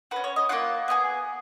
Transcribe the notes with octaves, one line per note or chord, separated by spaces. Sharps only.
C#4 F#4 B4
C#5
D#5
A#3 C#4 F4 F#5
B3 F4 G#4